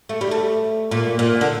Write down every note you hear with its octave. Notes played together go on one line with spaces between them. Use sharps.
A3
G3
A3
A#2
A#2
D3